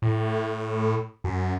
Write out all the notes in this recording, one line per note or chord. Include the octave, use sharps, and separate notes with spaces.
A2
F#2